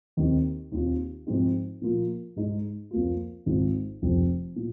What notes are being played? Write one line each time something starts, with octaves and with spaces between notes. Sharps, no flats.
D#2 D#3 C4 D#4
D#2 D#3 C4 F4
G#2 F3 G#3 C4 D#4
A#2 F3 A#3 F4
G#2 G#3 D#4
F2 F3 A#3 F4
G#1 G#2 D#3 C4 F4
F1 F2 C3
A#2